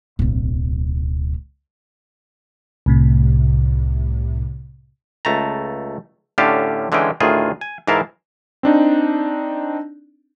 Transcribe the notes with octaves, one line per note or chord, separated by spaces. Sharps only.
D1 B1
C2 A2 C3
C#2 A3 A5 A#5
A2 D3 C#4 G4 F5 A5
D3 E3 G#3 C#4 G5
D2 A2 D#3 F4 G#4
G#5
G#2 E3 E4 A#4 F5 A5
C4 D4 D#4